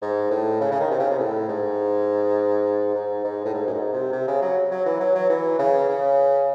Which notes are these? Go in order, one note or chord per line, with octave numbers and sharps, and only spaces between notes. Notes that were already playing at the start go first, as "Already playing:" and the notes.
G#2
A2
C#3
C#3
D#3
C3
C#3
C3
A2
G#2
G#2
G#2
A2
G#2
F#2
G#2
C3
C3
C#3
F#3
F#3
E3
F#3
F#3
E3
C#3
C#3